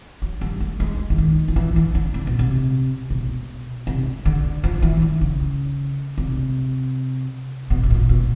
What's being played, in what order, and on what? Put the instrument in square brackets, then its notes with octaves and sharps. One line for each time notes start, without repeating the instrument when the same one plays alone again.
[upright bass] F#3
G3
A3
G#3
E3
D#3
F3
E3
E3
D3
C3
B2
C3
B2
C3
D3
F3
E3
D#3
C#3
C3
B2
B2
A#2
B2